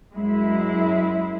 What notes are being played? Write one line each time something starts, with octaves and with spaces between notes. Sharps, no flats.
F#2 G#3 E4